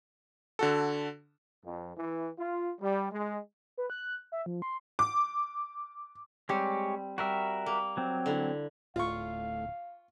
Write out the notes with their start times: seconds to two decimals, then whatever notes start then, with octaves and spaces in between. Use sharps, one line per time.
0.59 D3 F#4 A4
1.64 F2
1.97 E3
2.39 F4
2.80 G3
3.12 G#3
3.78 B4
3.90 F#6
4.32 E5
4.46 F3
4.62 C6
4.99 D6
6.49 G3 G#3 C4 G4 C#5
7.18 G3 F#4 A#4 E5
7.66 A#3
7.97 F#3 C4
8.26 D3 E4
8.96 D1 A2 F4 F5 C#6